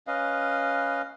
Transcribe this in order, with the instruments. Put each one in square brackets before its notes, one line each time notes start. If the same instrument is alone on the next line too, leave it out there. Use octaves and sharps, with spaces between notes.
[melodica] C#4 B4 D#5 F5